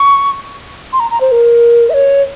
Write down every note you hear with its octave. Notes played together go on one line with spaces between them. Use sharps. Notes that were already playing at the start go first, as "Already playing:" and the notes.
Already playing: C#6
C6
A#5
A#5
C5
A#4
E5
C#5